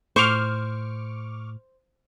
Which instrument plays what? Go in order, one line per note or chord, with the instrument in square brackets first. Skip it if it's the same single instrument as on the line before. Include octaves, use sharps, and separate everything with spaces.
[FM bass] A2 [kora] C5 [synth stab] C#6 D6 F6